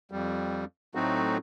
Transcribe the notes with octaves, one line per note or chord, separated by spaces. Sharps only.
F2 G3
A2 F#3 A3 C4 D#4 F#4